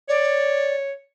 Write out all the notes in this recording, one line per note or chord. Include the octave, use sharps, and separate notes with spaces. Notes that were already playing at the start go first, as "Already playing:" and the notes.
C#5 D5